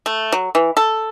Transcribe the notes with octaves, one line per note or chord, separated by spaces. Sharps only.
A3
F#3
E3
A4